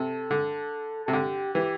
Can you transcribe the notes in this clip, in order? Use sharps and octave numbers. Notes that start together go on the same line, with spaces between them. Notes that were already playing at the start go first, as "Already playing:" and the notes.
Already playing: C3 A4
D3
C3 A4
D3 G4
E3 G4